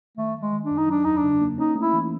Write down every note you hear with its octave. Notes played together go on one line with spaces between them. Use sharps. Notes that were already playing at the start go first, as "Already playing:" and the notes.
D#3 A3
G3
G#3
D#3
D4
F#2
D#4
F#3 D4
E2 D#4
D4
C#3
A#3
C#4 D#4
A3
E4
E3